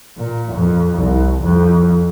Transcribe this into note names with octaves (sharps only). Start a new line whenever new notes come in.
A#2
F2
C2
F2